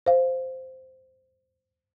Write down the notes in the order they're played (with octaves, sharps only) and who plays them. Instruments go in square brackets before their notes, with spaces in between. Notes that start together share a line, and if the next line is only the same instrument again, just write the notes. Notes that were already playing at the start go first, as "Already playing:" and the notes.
[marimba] C5 F5